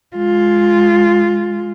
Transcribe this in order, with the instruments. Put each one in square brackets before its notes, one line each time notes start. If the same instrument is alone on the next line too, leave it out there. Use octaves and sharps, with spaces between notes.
[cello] G#3 F4